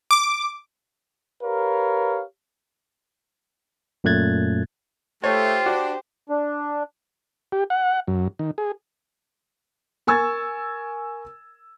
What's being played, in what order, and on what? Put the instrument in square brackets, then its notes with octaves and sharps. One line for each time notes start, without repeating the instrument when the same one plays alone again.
[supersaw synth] D6
[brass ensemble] G4 A#4 B4 C#5 F5
[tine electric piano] F#2 A#2 A3 F#6 G#6 A6
[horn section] A3 [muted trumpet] F4 [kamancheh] G4 C5 [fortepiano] C#5
[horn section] D4 [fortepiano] F#4
[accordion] D4
[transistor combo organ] G4
F#5
F#2
D#3
G#4
[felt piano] A#4 G#5 C#6 E6 G#6 A6